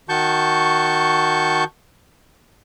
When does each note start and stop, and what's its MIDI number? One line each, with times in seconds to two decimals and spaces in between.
0.09 1.64 51
0.09 1.64 66
0.09 1.64 81
0.09 1.64 85
0.09 1.64 91